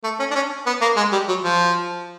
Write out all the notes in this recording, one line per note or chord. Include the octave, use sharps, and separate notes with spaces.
A3
C#4
D4
C#4
B3
A#3
G#3
G3
F#3
F3